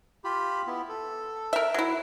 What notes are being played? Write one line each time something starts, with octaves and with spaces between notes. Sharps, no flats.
F4 G4 B5
B3 E4
A4
A#4 E5
F#3 E4